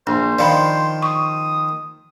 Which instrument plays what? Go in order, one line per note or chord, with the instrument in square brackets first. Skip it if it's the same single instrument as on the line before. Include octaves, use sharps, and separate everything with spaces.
[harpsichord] A#1 [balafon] D4 [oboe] C5
[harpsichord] D#3 F3 [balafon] D5 F5 B5
[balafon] C#6 [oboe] D#6